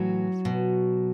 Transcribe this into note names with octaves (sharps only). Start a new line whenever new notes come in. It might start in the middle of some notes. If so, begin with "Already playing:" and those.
Already playing: A2 E3 F#3 F#4
B2